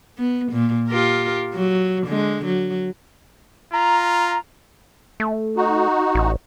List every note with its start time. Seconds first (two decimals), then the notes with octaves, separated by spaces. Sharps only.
0.18 B3
0.52 A#2
0.88 F4 G4 A#4
1.54 F#3
2.06 D3 G#3
2.45 F#3
3.73 F4 A#5
5.20 A3
5.56 D#4 F#4
6.15 A1